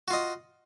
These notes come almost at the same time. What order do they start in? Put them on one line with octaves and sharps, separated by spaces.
F#4 F4 D#5